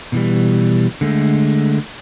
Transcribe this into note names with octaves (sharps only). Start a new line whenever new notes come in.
B2 E3 G3
D3 G#3 A3